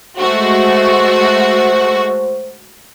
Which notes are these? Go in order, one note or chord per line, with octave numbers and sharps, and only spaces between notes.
G#3 A3 F#4 C5